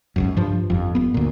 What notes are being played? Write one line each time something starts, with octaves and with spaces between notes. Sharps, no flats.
G#1 C#2 F#2
G2 F3
G1 F2
G1 B3
D2 A#2